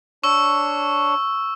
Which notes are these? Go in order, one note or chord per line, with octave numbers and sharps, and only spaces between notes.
D4 C#5 C#6 E6